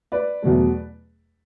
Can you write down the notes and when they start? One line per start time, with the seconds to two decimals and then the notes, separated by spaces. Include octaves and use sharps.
0.12 B4 D5
0.42 E2 B2 F#3 A3